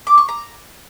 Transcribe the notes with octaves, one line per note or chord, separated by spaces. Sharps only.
D6
C#6
A#5